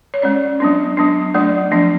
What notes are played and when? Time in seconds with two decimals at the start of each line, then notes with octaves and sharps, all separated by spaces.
0.14 C#5
0.22 G#3 C#4 D5
0.60 F#3 B3 D4
0.97 F#3 B3 D4
1.34 F#3 A3 D4 D5
1.71 F3 B3 D4